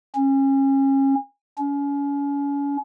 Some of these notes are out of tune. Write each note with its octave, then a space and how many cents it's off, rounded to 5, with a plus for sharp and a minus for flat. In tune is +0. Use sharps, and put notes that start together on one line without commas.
C#4 -30
C#4 +35